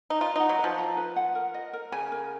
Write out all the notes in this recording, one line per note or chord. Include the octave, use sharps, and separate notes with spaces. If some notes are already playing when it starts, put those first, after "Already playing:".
D#4
F4 B4
D#4 F#5
F#3
B4
F3
A#5
B4
F#5
A#4
D#5
A#4
C#3 G#5
A#4